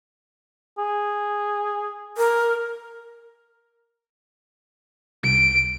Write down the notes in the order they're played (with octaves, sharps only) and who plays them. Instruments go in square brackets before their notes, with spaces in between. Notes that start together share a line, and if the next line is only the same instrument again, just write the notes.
[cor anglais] G#4
[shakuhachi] A#4
[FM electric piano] C2 [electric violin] D7